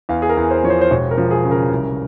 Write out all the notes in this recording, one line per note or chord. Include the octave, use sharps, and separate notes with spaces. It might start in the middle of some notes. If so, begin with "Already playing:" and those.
E2 F5
G#4
A#4
E2
C5
F3 C#5
C5
C5
E1 C#5
A#4
F3
G#4
C#3
A#4
C2